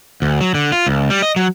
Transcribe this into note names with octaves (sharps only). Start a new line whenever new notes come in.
D2
F#3
D3
F4
C#2
G3
D#5
F#3